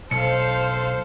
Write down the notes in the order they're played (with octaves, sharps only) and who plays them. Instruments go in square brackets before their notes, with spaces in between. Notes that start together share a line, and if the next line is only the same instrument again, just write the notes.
[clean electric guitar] B1 [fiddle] A4 F5 [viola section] C5 [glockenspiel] C#7